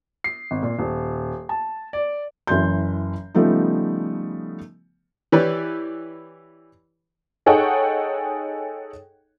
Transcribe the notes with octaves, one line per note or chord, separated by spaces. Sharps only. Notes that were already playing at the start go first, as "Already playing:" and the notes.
C7
G#1
A#2
D#1
A5
D5
F#1 E3 C6 G6
C#3 F3 G3 A3 B3 D#4
E3 G4 B4 C#5 D5
D#4 G#4 A4 C#5 F#5 G5